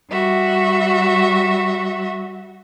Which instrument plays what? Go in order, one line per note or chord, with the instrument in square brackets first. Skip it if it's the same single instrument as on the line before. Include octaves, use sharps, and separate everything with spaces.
[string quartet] G3 F#4 E5